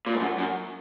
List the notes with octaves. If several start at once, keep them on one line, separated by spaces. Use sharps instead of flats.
A#2
G#2
F#2
F#2